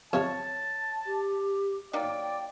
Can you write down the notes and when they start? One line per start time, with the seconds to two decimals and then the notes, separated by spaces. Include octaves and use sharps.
0.13 F2 C3 C#5 A5
1.06 G4
1.93 F#3 A#3 D#4 D5 G5